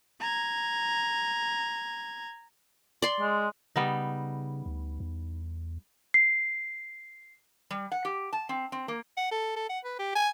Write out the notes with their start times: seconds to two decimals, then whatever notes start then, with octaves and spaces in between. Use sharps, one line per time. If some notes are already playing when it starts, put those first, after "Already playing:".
0.20 A#5 G#6
3.02 D5 C6
3.21 G#3
3.76 C#3 G3 B3 D#4
4.66 D2
5.00 E2
6.14 C7
7.71 G3
7.92 F#5
8.05 G4
8.33 A5
8.49 C4
8.72 C4
8.88 A#3
9.17 F#5
9.31 A4
9.56 A4
9.69 F#5
9.85 B4
9.99 G4
10.15 G#5